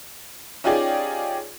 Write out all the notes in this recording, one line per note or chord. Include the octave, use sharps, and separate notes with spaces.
C#4 D#4 F4 G4 G#4 D5